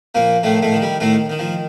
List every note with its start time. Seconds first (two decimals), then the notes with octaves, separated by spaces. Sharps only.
0.15 A#2 F3 A#3
0.43 A2 D#3 A3
0.62 A2 A3
0.72 D#3
0.82 G3
1.00 A2 D#3 A3
1.30 D#3
1.39 F3